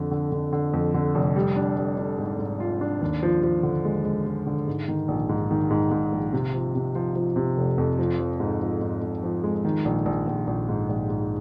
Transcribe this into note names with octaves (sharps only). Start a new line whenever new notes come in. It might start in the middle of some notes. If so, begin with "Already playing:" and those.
Already playing: F2 D3
D3
D3
D3
F2
D3
F1
G3
D4
G3
D4
G#2
G#2
F4
D4
D#2
F3
F3
D3
G#3
G#3
G#3
D3
G#2
D#3
A#1
G#2
D#3
G#2
G#2
A#1
C3
F3
C3
F3
F3
C3
F1
F2
F3
F3
G#2
F3
G#2
G#2
F3
G#3
D#3
A#1
A#1
A#1
A#1
G#2
A#1
G#2